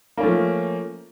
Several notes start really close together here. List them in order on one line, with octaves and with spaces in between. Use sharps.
A#3 C#4 A3 F3